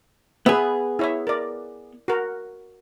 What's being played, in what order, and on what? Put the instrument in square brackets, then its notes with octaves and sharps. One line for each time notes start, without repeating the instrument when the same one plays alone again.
[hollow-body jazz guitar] B3 G#4 [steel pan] B4 E5
[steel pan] E4 C#5 E5
A#4 D5
F#4 A#4